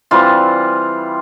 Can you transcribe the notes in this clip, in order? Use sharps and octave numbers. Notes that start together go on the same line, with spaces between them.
E3 G3 C4 F4